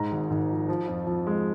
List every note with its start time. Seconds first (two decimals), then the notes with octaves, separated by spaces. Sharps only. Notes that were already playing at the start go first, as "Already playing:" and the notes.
Already playing: G#2 G#3 A#5
0.11 G#1
0.30 G#1
0.50 F3
0.69 F3
0.88 F2
1.07 F2
1.27 G#3